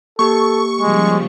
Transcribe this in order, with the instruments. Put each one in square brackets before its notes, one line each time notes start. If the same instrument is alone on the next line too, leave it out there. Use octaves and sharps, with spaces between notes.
[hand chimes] A#3 G4 [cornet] A4 [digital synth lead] C#6
[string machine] C#3 F3 G3 [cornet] G#3